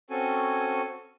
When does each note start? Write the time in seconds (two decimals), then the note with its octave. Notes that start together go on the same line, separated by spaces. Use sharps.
0.10 C4 C#4 F#4 A4 G#5